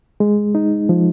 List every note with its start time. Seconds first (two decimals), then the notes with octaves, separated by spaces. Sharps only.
0.20 G#3
0.55 D#4
0.89 F3